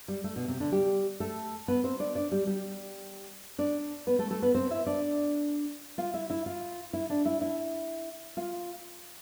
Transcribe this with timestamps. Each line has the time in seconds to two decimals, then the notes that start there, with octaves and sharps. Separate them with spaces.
0.08 G3
0.24 A3
0.36 B2 B3
0.48 C3 C4
0.60 D3 D4
0.72 G3 G4
1.20 A3 A4
1.68 B3 B4
1.84 C4 C5
1.99 D4 D5
2.15 D4 D5
2.32 G3 G4
2.47 G3 G4
3.59 D4 D5
4.07 B3 B4
4.19 A3 A4
4.31 A3 A4
4.42 B3 B4
4.55 C4 C5
4.71 E4 E5
4.86 D4 D5
5.98 F4 F5
6.14 E4 E5
6.30 E4 E5
6.46 F4 F5
6.93 E4 E5
7.10 D4 D5
7.25 E4 E5
7.41 E4 E5
8.37 F4 F5